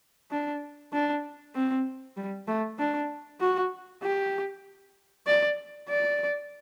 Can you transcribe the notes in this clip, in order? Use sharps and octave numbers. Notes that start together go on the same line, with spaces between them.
D4
D4
C4
G3
A3
D4
F#4
G4
D5
D5